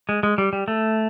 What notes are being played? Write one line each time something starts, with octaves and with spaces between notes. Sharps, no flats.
G#3
G#3
G3
G3
A3